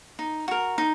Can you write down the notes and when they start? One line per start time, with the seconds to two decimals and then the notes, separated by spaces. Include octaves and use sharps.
0.19 D#4
0.48 F#4 A#4
0.78 D#4